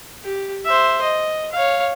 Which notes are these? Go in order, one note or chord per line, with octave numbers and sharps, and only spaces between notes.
G4
C5 E5
D#5
C#5 F5